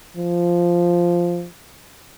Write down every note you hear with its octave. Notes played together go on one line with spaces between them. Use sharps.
F3